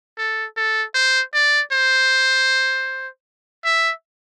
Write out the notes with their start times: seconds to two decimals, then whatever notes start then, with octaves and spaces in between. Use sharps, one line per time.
0.18 A4
0.57 A4
0.94 C5
1.34 D5
1.72 C5
3.65 E5